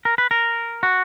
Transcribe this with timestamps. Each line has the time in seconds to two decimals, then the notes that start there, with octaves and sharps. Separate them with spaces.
0.05 A#4
0.18 B4
0.31 A#4
0.83 F#4